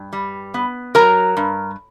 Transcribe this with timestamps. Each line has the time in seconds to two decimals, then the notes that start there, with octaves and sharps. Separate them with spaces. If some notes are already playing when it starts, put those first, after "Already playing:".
Already playing: G2
0.13 G3
0.54 B3
0.95 F#3 A#4 A#5
1.37 G2